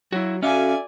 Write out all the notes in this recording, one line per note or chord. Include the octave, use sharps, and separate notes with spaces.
F#3 E4 F#4
C#4 F#4 A4 D5 E5 F5 G#5